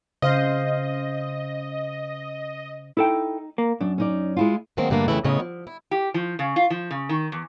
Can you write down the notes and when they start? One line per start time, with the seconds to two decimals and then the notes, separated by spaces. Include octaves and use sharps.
0.22 C#3 C5 D#5 F5
2.97 D#4 E4 A4 G5
3.58 A#3
3.81 F#2 D4
3.98 C#4 D#4 D5
4.37 G#3 E4 F4
4.77 D#3 F#3 G#3 A#3 C4
4.90 G2 D3 A3 A#3 D4
5.08 F2 A#2 C#3 E3 A3 E4
5.24 A2 C#3 B3 D#4 C#5 D#5
5.40 F3
5.67 E4
5.91 G4
6.14 F3
6.39 C#3
6.56 F4
6.70 F3
6.91 C#3
7.09 D#3
7.32 E2